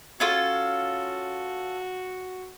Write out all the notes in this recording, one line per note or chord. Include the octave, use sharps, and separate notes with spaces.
C#4 F4 F#4 A4